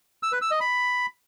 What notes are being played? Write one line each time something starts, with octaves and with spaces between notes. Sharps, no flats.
E6
B4
E6
D#5
B5